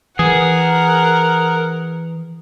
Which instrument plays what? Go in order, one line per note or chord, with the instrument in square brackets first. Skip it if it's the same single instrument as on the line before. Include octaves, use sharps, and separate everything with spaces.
[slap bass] E3 [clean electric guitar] G#4 [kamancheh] A#4 F#5